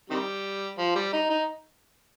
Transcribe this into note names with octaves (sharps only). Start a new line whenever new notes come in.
C3 D#3 G3
F3
G3
D#4
D#4